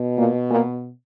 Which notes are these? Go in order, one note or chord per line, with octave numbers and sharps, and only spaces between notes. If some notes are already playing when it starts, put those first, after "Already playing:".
Already playing: B2
A#2 A#3
A#2 A#3